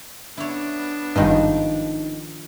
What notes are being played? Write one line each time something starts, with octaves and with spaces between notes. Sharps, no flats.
B3 D4 E4 C#5
G#1 G2 D#3 F3 D#4